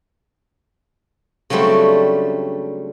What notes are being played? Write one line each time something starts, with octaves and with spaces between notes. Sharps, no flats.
C#3 F#3 G3 A3 C4 D4